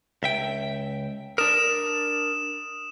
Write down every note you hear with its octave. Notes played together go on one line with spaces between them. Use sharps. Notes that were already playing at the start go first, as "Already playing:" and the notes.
C#2 E5 G5
D4 A#4 D#6 E7